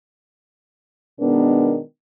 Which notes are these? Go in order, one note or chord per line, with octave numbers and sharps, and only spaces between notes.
B2 D#3 G#3 B3 D4 A#4